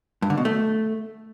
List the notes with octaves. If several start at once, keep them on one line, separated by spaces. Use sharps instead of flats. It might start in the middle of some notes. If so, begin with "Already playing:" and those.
G2
D3
B2
A3